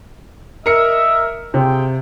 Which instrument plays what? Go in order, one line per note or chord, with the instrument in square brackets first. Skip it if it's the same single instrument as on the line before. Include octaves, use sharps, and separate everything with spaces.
[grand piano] A#4 C#7 [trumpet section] D#5 E5
[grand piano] C3 [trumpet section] F4 G#4 G5